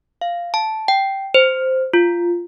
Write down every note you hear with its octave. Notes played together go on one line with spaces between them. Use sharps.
F5
A5
G5
C5
F4